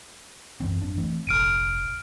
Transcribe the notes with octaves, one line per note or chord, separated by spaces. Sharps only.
F#2 E3 C4
G#1 F#2 D4
E3 A3 C4
F1 A#1 F6 D7 D#7